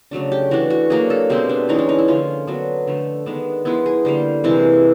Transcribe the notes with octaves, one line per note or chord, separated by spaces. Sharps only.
C#3 F#3 A3 D4
G4
E3 A3 D4 F#4
F#4
F#3 A#3 D4 G#4
A4
B2 G#3 C4 G4
D4
E3 G#3 C#4 D#4
D4
D#4
E4
D3 F3 A#3 C#4 F4
F#3 B3 D4
D3 F3 A3
D#3 G#3 B3 D4
F3 G#3 B3 E4
G#4
D3 G3 A#3 C5
C3 E3 G#3